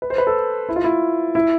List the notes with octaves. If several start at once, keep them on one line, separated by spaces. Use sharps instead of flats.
B4
C5
B4
A4
E4
F4
E4
E4